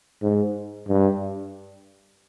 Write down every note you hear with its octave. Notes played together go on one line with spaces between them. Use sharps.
G#2
G2